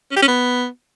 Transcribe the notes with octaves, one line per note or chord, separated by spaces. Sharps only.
C#4
G4
C#4
B3